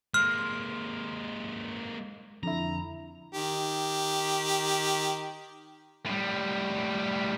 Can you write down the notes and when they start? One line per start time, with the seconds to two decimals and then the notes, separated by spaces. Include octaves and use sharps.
0.14 G#3 A#3 C6 F6
2.43 F2 D3 E4 A#5
3.33 D#3 G4
6.06 A2 G3